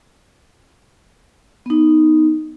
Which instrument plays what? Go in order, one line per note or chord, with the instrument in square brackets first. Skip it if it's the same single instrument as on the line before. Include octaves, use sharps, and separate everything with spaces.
[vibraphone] B3 D#4